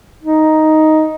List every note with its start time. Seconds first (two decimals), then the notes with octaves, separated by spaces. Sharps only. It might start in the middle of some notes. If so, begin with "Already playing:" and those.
0.23 D#4